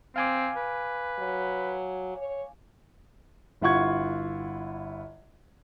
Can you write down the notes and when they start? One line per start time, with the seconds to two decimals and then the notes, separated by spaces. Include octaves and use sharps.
0.16 C4 F5 G#5 D6
0.56 B4
1.19 F#3
2.17 C#5
3.61 G1 E4 F4 F#5 C#6 G#6